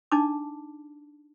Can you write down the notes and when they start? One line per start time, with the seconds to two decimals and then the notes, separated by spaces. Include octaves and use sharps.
0.12 D4 D#4 A5 D6